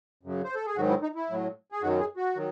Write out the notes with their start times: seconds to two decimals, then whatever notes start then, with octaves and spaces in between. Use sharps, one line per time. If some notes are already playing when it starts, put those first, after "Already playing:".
0.23 F#2 C#3 F#3
0.44 C5
0.55 A4
0.66 G#4
0.76 G#2 D#3 F#3 F#4
0.89 E4
1.03 D#4
1.16 E4
1.30 A2 F#3
1.72 G#4
1.82 F#2 D#3 F#3 F#4
2.00 G#4
2.17 F#4
2.36 D#3 F#3